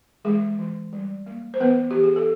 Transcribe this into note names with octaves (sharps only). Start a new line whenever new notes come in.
E3 G#3 G#4
E3
G3
A#3
C5
E3 B3 B4
E3 G4
G#4
A4